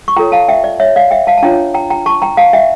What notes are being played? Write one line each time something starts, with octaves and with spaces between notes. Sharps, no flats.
C#6
F4 A4 C#5 G5 A#5
F5 A5
E5 G5
D5
C#5 E5
D5 F5
E5 G5
F5 A5
A5
D4 F4 C#5 G5 A#5
G5 A#5
G5 A#5
A5 C#6
G5 A#5
F5 A5
E5 G5